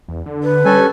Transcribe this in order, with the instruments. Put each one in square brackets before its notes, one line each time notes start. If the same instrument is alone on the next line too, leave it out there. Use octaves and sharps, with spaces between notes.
[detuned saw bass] E2
D3
[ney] B4
[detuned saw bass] G3 [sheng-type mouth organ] C#4 A4 G#5